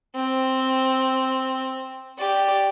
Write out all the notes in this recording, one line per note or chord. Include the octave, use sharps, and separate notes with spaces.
C4
G4 D5